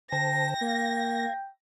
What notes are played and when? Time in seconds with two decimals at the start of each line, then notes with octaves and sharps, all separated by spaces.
0.12 D3 C5 G5 A5 A#6
0.61 A#3 F5 G#6